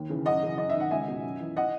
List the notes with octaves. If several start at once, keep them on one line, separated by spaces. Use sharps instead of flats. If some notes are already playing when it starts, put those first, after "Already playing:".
Already playing: D#2
C#3 E3
F#2 D#5 F#5
C#3 E3
F#2 D#5
E5
D#3
F#5
C#2 E5 G#5
B2
F#2
E3
D#5 F#5